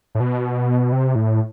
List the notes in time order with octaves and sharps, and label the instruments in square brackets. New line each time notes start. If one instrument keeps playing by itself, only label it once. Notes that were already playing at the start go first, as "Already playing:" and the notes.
[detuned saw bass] A2
B2
C3
A2